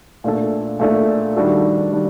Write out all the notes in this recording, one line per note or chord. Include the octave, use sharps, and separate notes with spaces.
A#2 A3 D4 A4
A#2 A3 D4 A4
D#3 G3 D4 F#4 A4
D#3 G3 D4